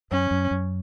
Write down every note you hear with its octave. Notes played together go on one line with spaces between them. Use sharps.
F#2 C#4
F#2
F#2